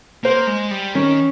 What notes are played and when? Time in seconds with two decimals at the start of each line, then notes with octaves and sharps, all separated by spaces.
0.24 A#3 C5
0.47 G#3
0.71 G3
0.95 D#3 C#4